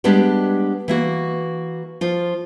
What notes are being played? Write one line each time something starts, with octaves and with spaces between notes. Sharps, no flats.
G3 G#3 B3 D4 G4
E3 A#3 F#4
F3 F4